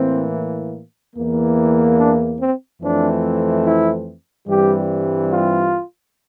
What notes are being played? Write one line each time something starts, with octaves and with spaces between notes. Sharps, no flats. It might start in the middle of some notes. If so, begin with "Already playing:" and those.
Already playing: A2 E3 A#3 C4
E2 E3 A#3
D4
C4
F2 E3 A3 C4 D4
E4
G2 E3 G3 C4 G4
F4